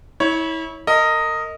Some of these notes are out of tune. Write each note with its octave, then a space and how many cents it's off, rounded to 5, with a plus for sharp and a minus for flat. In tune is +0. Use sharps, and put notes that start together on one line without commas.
E4 -30 C#5 +0
A#4 -35 D#5 +0